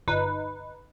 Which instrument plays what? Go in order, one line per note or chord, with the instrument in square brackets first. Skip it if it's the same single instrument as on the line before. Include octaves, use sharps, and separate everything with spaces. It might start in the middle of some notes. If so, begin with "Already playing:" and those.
[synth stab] G1 D#4 B4